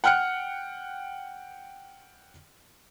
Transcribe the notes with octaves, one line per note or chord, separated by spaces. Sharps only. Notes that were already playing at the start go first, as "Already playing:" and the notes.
F#5 G5 F6 F#6 C#7